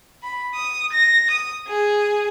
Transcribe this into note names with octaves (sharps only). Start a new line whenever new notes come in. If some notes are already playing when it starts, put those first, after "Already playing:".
B5
D#6
A#6
D#6
G#4